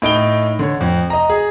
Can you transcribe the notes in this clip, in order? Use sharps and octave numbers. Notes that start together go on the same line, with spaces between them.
A2 D#4 D7 G7
D3 C#5
F2
D#5 A#5
G#4